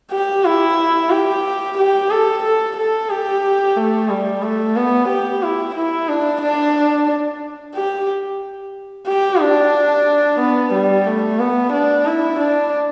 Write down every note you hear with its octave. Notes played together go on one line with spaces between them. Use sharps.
G4
E4
G4
G4
A4
A4
A4
G4
A3
G3
A3
B3
G4
E4
E4
D4
D4
G4
G4
D4
B3
G3
A3
B3
D4
E4
D4